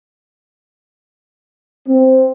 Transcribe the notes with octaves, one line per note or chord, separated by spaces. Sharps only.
C4